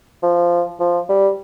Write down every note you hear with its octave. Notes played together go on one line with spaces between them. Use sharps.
F3
F3
G3